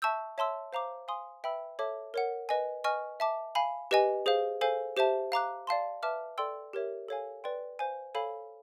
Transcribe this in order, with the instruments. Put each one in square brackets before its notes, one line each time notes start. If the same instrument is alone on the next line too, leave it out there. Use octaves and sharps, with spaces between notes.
[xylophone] E5 A5 C#6 E6 G6
C#5 E5 A5 C6 E6
C5 F5 A#5 D6
F5 G#5 C6 D#6
B4 E5 G5 B5 E6
A4 C#5 E5 A5 D6
A#4 C#5 F#5
B4 D#5 G#5
B4 D#5 G#5 C#6 F6
E5 A5 D6
F5 G#5 B5
G4 B4 D#5 G#5
G#4 C5 F5
A4 C5 F5 G#5
G4 C5 E5 A5
F5 A#5 D6 F#6
D5 F5 A5 C6
B4 E5 A5 D6 F6
A4 D5 G5 C6 E6
G4 A#4 C#5 E5
A4 C#5 F5 G#5
B4 D5 G5 C6
C5 F5 G#5
A4 C#5 F5 G#5 B5